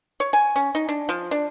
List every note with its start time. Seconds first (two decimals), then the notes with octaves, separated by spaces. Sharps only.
0.20 C#5
0.33 G#5
0.56 C#4
0.75 D#4
0.89 D4
1.09 F3
1.31 D4